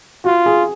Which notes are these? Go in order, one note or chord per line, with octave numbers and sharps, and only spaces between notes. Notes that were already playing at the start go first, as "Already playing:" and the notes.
F4 F#4
G#4